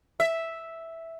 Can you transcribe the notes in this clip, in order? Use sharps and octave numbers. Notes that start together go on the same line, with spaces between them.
E5